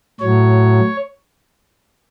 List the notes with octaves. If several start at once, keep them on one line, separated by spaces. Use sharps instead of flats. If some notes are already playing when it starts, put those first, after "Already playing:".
A2 F#3 C#5